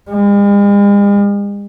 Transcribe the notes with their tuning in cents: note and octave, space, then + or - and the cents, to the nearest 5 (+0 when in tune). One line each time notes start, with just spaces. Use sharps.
G#3 -45